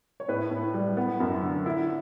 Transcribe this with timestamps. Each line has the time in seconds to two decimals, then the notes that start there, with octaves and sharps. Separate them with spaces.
0.20 C#5
0.28 A2 B4
0.51 A2
0.74 G3
0.97 B3
1.20 F#2
1.42 D3
1.66 E4